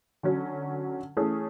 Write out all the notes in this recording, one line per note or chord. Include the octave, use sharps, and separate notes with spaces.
D3 F#3 C#4 F#4
E3 A3 C#4 G#4